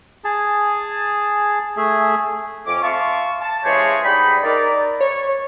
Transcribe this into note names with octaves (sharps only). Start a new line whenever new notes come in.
G#4 A5
A3 G#4 E5
F2 C#4 D6
E5 F5 A5 C6 C#6
A5
C#3 E3 G#3 G4 C5 C#5
G#2 G3 D#4 G5 B5
D#4 A#4 D5
C#5